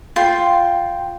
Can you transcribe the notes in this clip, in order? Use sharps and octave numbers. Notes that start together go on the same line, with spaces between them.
F4 G5 C6